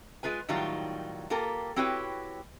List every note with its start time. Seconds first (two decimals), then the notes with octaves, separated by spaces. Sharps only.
0.23 G#3 F4 B4 G#5
0.49 A2 D#3 F#3 G3 D#4 F4
1.30 A#3 F4 G4 A4 A#4
1.76 C4 E4 F#4 G4 B4 C#5